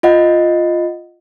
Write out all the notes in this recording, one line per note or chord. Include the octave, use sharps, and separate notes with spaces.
F4 D#5 F#5